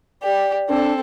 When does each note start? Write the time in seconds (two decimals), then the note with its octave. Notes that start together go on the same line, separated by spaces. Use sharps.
0.23 G4 D5
0.69 C4 D4 A4